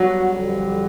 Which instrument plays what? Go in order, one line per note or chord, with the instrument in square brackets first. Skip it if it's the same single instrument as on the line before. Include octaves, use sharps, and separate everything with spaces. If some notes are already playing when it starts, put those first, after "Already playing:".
Already playing: [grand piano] F#3 [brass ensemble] G3 B3 D4 F#4
[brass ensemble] F2 D3 G3